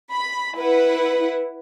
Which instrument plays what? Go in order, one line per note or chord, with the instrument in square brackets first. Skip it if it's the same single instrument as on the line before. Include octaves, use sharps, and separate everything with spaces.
[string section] B5
E4 B4 F#5